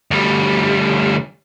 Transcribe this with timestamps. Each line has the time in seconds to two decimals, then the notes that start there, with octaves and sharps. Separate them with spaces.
0.11 D2 G3